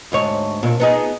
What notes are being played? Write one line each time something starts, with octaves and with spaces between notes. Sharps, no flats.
D2 G#2 C#5
A#2
B3 D#4 G#4